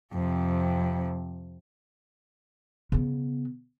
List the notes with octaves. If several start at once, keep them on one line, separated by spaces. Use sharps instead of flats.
F2 C3
C#3 B3